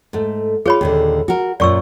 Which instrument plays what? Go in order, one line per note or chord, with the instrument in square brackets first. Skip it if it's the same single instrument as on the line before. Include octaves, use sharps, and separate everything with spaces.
[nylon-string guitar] G#2 A3
[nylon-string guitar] F4 [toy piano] G#4 C#5 B5
[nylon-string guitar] D#2 A#2 D3
F#4 A#4
[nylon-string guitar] F#2 A#2 [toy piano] D5 C#6 E6